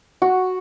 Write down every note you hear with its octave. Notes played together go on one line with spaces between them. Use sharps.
F#4